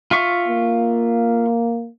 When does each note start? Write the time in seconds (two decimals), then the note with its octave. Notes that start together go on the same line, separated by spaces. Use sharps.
0.11 F4 E5 C#6
0.48 A#3